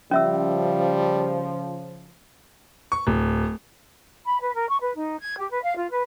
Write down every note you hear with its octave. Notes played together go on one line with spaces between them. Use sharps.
C#3 F3 G3 C#4 E5 E6
C#6
D1
B5
B4
A#4
C#6
B4
D#4
G#6
G4
B4
F5
F4
B4